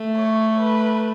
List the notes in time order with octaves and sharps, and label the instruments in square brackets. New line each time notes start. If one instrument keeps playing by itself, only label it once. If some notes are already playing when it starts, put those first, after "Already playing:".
Already playing: [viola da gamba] A3
[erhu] C#5
B4